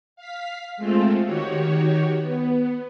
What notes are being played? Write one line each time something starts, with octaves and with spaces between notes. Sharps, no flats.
F5 B6
G#3 A3 C4 F4 A4
D#3 F#4 G4 C#5
B3